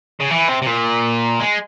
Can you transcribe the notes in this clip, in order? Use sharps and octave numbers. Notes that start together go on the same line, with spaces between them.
C#3
E3
C3
C3
A#2
G#3